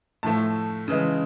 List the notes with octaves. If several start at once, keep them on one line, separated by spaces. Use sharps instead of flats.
A2 F3 A3 A5
C#3 E3 G#3